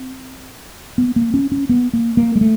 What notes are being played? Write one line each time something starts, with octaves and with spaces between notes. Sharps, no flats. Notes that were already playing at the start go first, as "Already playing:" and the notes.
Already playing: C4
B3
A#3
C#4
C#4
B3
A#3
A#3
G#3
A3